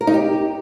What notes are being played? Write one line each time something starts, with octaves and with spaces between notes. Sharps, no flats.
A#4
D#4
G4